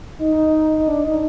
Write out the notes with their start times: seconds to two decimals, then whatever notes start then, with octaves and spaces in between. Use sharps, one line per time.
0.19 D#4
0.78 D#4
0.88 D4
1.05 D#4